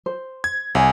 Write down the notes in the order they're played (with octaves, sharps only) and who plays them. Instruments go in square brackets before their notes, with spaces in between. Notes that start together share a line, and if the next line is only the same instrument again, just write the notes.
[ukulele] C5
[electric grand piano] G#6
[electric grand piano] C2 [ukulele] C#5 F#5 G#5